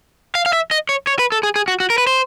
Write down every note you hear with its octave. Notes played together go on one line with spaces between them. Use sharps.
F5
F5
E5
D#5
C#5
C#5
B4
A4
G#4
G#4
F#4
F#4
A#4
B4
C5